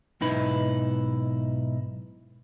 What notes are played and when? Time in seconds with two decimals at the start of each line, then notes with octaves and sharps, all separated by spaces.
0.21 B1 G#2 D#4 E4 B4